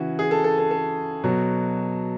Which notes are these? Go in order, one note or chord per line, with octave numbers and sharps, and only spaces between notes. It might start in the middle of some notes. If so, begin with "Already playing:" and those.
Already playing: C#3 E3 F#4
G#4
A4
A4
A4
A4
B2 F#3